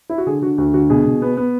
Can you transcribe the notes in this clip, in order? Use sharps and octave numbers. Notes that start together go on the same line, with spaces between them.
E4
F#4
D3 G#4
D3 F#4
D2 F#4
D3 F#4
B2 G#4
B2
B3
B3